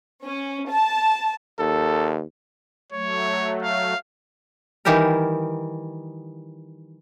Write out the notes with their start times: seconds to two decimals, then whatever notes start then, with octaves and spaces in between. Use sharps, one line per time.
0.23 C#4
0.70 A5
1.59 D#2 A4
2.92 F#3 A3 C#5
3.63 F5
4.85 D#3 E3 G3 G4 A#4